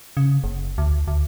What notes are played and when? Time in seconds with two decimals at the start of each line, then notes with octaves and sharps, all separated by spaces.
0.17 C#3
0.44 F#1
0.78 D2
1.08 D2